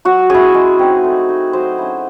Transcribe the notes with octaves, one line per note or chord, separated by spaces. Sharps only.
F#3 F#4
C#4 E4 G#4
G#3
C4 D#4
A3
D#4
F#3 C5
C#4 E4